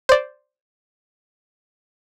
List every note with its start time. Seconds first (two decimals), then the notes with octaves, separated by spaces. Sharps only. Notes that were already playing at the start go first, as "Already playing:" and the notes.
0.09 C5 D5